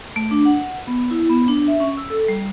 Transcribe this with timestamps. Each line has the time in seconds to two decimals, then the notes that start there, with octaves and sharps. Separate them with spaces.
0.16 A3
0.31 D4
0.45 F#5
0.87 B3
1.11 E4
1.29 B3
1.48 D4
1.68 E5
1.80 C#4
1.97 E6
2.10 A4
2.28 G3